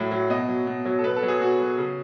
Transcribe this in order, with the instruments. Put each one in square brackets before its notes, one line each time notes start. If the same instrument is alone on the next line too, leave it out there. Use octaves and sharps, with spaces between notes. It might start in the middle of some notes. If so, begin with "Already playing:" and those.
Already playing: [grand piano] A2 F#3
F#3
B2 D#5
F#3
B2
F#3
A4
B2 B4
A4
F#3
G#4
B2 F#4
F#3
C#3